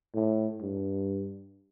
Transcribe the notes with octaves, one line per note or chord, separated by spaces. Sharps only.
A2
G2